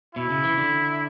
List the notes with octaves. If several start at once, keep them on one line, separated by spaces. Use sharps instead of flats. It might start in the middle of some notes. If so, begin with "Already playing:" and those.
B2 E4
C#3
E3
D3